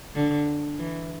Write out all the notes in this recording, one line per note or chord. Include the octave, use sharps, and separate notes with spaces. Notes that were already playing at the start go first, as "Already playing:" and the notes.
D3
E3